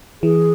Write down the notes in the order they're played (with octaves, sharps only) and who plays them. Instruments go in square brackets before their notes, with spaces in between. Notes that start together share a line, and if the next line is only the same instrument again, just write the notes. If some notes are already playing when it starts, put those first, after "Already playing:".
[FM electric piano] E3 [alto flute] G#4